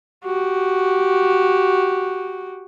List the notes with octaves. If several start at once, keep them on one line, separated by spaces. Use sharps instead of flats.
F#4 G4